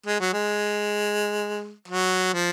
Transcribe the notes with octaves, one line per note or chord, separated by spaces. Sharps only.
G#3
F#3
G#3
F#3
F3